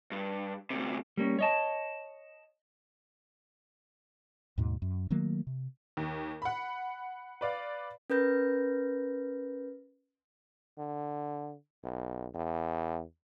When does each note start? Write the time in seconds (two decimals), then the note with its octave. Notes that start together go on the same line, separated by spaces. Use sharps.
0.11 G2
0.70 D2 C3
1.17 G3 A#3 C#4
1.39 C#5 D#5 A5
4.58 D#2 G#2 B2
4.82 F#2
5.10 D#3 F#3 A3 A#3
5.47 C3
5.97 D#2
6.42 F#5 B5
7.41 B4 D5 F5
8.10 C#4 A#4 B4 G6 A#6
10.78 D3
11.84 B1
12.35 E2